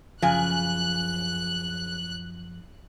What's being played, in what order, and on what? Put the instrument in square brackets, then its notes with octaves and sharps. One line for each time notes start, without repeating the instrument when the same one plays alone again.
[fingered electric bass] F#2 F3 [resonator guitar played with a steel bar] C#3 G#5 [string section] F#6